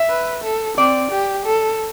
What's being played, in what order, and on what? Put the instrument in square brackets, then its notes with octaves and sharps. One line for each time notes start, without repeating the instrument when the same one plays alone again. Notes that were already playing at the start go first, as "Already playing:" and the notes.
Already playing: [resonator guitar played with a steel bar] E5
[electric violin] B4
A4
[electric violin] C4 [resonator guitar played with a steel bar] D5
[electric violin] G4
A4